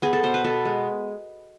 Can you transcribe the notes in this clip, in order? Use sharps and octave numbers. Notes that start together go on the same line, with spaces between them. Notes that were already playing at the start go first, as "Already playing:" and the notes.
B3 G#4
A4
B2 C5
B4
B2 A4
G#3